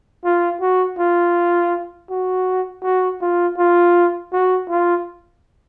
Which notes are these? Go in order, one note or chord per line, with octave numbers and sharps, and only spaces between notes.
F4
F#4
F4
F#4
F#4
F4
F4
F#4
F4